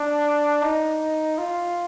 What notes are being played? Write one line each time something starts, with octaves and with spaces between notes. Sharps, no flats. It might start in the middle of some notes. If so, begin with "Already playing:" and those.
Already playing: D4
D#4
F4